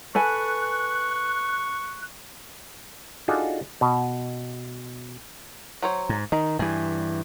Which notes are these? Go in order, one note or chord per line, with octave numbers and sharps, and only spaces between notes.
A4 B4 G#5 C#6 F#6
D4 D#4 F4 F#4 G#4 A4
B2
F#3 C5 C#5
G#2
D#3 D#4
G2 E3 G#4 G#5